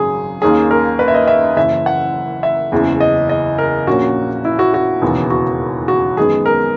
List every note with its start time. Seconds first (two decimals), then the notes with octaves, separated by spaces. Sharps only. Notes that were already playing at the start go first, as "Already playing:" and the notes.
Already playing: G#1 F#2 C#3 F#3 G#4
0.41 D#2 D#3 A#3 C#4 G#4
0.71 A#4
0.99 B4
1.08 E5
1.14 D#5
1.28 E5
1.57 F#1 F#2 E3 E5
1.86 F#5
2.43 E5
2.72 F#1 E2 C#3 E3
3.00 D#5
3.29 D#5
3.58 A#4
3.87 A#1 A#2 A#3 C#4 F#4
4.45 E4
4.59 F#4
4.74 F#4
5.02 E1 D#2 C#3 E3 B3
5.30 F#4
5.88 F#4
6.17 F#2 D#3 G#3 B3 G#4
6.46 A#4